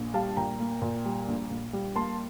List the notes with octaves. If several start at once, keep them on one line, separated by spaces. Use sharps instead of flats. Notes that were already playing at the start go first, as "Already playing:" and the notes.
Already playing: A#1
G3 F5 A5
A#2 G5 A#5
A#3
A#2
G3
A#1
A#1
G3
A#3 A5 C6